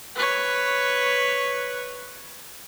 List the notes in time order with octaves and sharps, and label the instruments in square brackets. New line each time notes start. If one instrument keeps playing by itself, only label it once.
[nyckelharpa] B4 C#5